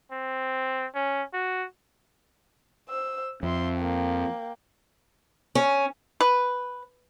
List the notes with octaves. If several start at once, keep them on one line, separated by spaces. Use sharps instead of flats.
C4
C#4
F#4
C5 E6
F2 E5 C6
A#3 G5
C#4
B4